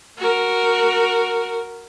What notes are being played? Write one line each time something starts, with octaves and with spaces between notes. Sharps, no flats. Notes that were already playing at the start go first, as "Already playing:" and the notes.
F#4 A#4